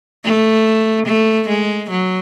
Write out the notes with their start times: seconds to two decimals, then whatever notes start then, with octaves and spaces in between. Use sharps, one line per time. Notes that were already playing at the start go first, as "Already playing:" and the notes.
0.24 A3
1.06 A3
1.49 G#3
1.90 F#3